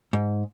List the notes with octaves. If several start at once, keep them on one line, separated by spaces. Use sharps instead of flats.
G#2